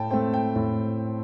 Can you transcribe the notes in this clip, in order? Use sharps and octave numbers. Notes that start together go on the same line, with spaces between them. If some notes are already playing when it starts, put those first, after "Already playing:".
Already playing: A2 G5 A5
A3 C4 G5
G5
A2